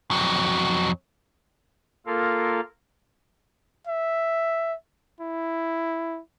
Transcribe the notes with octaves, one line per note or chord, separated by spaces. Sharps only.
F2 F#3
A#3 F4 A4 A#4 F5
E5
E4